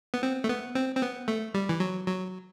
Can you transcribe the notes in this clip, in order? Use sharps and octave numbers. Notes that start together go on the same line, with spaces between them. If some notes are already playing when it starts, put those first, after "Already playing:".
B3
C4
A3
B3
C4
C4
B3
A3
G3
E3
F#3
F#3